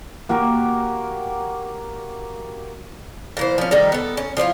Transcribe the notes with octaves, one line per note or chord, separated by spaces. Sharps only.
A#3 F#4 G4 A#4
A#2 E3 C5
F3 C#4
D#3 G3 A3 D#4
B3 A4
C#4
F3 D4 E4 F4